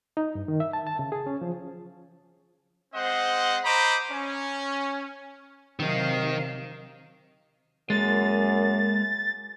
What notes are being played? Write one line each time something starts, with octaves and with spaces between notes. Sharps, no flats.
D#4
G2
D#3
E5
A5
A5
C#3
G#4
C#4
F3
G#3 C4 C5 D#5 F#5
C5 D#5 A#5 B5 D6
C#4
C3 D#3 F#3 D#4 F5
F#2 G#3 A#3 A6